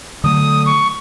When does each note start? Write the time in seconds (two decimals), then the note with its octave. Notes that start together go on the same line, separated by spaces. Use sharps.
0.24 D3 F#3 A3 D#6
0.66 C#6